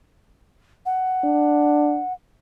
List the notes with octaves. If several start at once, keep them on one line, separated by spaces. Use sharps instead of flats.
F#5
D4